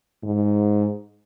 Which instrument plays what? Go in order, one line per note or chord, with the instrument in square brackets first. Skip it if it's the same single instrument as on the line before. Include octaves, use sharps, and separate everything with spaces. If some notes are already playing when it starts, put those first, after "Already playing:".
[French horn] G#2